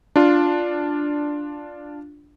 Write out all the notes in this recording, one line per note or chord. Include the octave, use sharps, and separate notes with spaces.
D4 F4